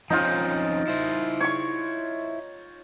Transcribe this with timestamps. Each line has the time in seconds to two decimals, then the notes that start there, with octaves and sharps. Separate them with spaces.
0.10 F3 C4 C#4 D#4 F4
0.88 E4 C5
1.41 C#5 C#6